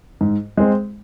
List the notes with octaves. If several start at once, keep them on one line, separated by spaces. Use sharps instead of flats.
G#2
G#3 C4